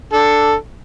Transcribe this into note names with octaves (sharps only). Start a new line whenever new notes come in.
D4 A4